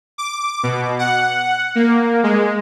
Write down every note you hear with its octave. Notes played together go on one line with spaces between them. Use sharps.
D6
B2
F#5
A#3
G#3